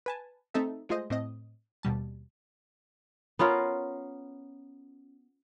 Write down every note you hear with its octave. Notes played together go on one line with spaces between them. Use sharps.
B4 G#5 A5
A3 C4 D#4 A4 E5
G#3 A3 F4 G#4 C5 D#5
A2 C4 D#5
D#2 B2 G3 A5
B3 C#4 F4 A#4